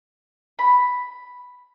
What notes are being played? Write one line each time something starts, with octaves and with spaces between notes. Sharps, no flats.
B5